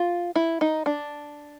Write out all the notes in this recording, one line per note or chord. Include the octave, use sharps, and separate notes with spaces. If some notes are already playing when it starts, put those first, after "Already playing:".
Already playing: F4
E4
D#4
D4